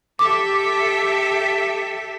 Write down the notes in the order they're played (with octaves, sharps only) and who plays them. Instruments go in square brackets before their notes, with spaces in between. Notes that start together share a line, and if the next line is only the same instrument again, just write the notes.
[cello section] G4 A4 E5 [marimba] D6